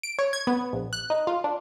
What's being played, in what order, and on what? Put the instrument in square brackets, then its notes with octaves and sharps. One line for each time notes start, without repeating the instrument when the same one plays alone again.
[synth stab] D7
C#5
G#6
B3
A#1
F#6
D#4
F4
D4